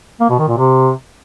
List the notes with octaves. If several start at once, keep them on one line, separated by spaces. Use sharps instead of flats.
A#3
B2
D#3
A#2
C3